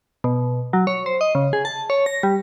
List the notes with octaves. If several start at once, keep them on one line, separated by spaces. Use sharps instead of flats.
B2
F#3
C#5
C5
D#5
C#3
G#4
A5
C#5
A#6
G3